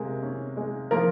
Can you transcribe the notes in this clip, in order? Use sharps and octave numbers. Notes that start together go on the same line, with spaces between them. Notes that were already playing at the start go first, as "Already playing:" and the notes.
Already playing: C3 G#3 A#3
C#4
G#3
F3 A#3 A#4